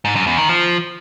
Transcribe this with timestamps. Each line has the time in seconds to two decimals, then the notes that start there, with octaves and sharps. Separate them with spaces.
0.05 G#2
0.16 F#2
0.27 E2
0.38 D#3
0.49 F3